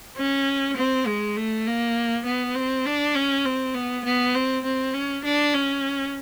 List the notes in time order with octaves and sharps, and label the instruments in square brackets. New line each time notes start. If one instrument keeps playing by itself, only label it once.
[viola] C#4
C4
G#3
A3
A#3
B3
C4
D4
C#4
C4
B3
B3
C4
C4
C#4
D4
C#4